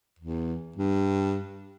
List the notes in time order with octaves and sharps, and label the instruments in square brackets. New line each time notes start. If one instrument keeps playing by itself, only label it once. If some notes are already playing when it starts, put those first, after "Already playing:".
[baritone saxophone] E2
G2